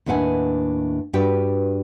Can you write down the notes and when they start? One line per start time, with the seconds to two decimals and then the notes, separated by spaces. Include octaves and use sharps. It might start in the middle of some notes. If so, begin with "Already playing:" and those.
0.06 D#2 A2 D4 B4 F#5 G#5
1.13 G2 D4 F#4 G4 B4 G5